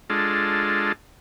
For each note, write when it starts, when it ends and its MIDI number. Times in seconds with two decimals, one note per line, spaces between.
0.10 0.92 56
0.10 0.92 62
0.10 0.92 65
0.10 0.92 69